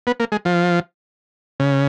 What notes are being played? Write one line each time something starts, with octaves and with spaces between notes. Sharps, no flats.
B3
A#3
G#3
F3
C#3